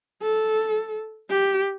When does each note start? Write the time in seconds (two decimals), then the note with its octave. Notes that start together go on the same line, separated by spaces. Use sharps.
0.22 A4
1.30 G4